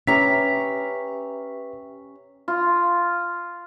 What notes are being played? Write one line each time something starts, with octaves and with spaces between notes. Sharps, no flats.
C#4 G4 B4 E5 A#5 B6
F4